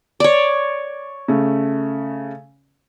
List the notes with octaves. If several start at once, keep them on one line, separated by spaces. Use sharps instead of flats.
C#5 D5
C#3 A3